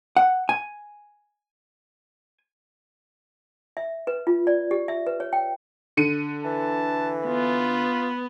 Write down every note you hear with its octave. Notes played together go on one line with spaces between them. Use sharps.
F#5
G#5
E5
B4
F4
D5
G4
E5
B4
C#5
G5
D3 C#7 D#7
E3 A5
B3 F4